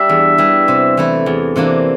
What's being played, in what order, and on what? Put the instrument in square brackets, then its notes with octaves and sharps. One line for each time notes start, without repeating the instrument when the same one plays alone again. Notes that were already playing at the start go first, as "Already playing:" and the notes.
Already playing: [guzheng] G3 D4 [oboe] E5
[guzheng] E2
E3 G3
C3
E3 A3 E4
E2
C3 E3 A#3 D4